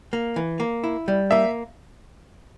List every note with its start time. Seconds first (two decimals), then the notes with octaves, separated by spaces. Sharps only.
0.13 A#3
0.36 E3
0.60 A#3
0.84 E4
1.08 G3
1.31 A#3 E5